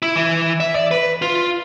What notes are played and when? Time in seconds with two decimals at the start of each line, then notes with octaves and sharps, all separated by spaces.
0.02 E4
0.16 E3
0.60 E5
0.75 D5
0.91 B4
1.22 F4